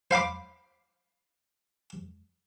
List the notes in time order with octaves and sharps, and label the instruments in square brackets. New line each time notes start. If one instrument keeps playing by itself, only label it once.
[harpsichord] C5 F5 B5 D6